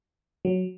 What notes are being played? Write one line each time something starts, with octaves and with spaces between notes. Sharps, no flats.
F#3